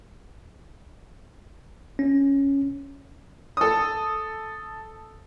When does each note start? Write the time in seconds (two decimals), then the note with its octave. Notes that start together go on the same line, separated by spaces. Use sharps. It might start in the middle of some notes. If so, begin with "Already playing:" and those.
1.99 C#4
3.57 A4 D#6